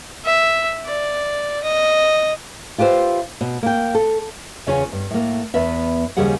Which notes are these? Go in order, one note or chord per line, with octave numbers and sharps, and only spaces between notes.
E5
D5
D#5
F4 G4 B4 C5 E5
B2
A#3 G5
A4
E2 C#3 C#4 F4 C#5 G#5
G2
A2 A#3
E2 B3 B4 E5
D#2 C#3 F3 G3 G#4 F#5